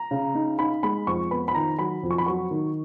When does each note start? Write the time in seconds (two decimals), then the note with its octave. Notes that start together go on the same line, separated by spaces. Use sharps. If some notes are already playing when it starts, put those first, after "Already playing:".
Already playing: A#5
0.11 C#3
0.35 D#4
0.59 D#4 B5
0.83 G#3 B5
1.07 F2 C#6
1.31 B3 B5
1.48 B5
1.55 D#3 A#5
1.79 F#3 B5
2.03 F2
2.11 C#6
2.18 B5
2.26 F#3 C#6
2.51 D#3